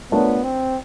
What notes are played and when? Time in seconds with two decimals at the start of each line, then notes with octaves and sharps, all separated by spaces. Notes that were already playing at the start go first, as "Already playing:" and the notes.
0.12 A3 B3 D4 F4 A#4 C#5
0.44 C4